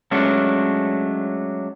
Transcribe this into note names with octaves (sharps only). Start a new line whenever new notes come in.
F#3 G#3 A3 C#4 D4